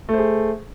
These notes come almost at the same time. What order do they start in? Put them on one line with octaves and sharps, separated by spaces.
A3 C5 G#4